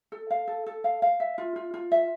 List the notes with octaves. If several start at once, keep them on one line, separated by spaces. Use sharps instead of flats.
A4
F5
A4
A4
F5
F5
E5
F4
F4
F4
E5